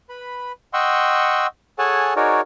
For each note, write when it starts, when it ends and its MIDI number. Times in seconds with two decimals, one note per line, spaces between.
0.09 0.52 71
0.09 0.52 83
0.73 1.47 75
0.73 1.47 78
0.73 1.47 79
0.73 1.47 84
0.73 1.47 85
0.73 1.47 88
1.79 2.14 68
1.79 2.14 69
1.79 2.14 73
1.79 2.14 78
1.79 2.14 80
1.79 2.14 81
2.16 2.41 63
2.16 2.41 66
2.16 2.41 68
2.16 2.41 70
2.16 2.41 73
2.16 2.41 74